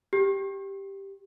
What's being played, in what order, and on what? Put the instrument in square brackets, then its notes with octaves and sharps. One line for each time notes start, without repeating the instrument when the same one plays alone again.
[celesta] G4